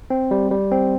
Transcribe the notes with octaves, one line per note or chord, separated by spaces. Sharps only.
C4
G3
G3
C4